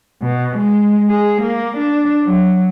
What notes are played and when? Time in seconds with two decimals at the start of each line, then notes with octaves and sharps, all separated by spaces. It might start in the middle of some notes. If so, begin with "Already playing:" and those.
0.22 B2
0.57 G#3
1.09 G#4
1.42 A#3
1.77 D4
2.24 F#3